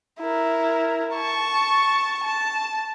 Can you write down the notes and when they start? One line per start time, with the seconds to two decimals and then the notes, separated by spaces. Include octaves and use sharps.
0.20 E4 A#4
1.14 A5 C#6
2.24 A5